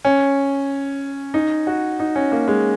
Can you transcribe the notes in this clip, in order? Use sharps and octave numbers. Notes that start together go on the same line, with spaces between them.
C#4
D#4
F#4
D#4
C#4
A#3
G#3